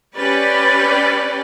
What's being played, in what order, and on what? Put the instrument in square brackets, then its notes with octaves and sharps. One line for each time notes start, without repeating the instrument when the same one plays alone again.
[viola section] C#4 G4 B4 D5